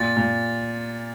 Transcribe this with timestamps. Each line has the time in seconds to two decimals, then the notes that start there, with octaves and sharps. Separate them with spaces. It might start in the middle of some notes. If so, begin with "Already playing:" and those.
Already playing: A#2 A6
0.17 A#2